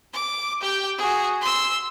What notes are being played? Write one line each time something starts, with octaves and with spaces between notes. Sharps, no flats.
D6
G4 G5
F#4 G#4
C6 E6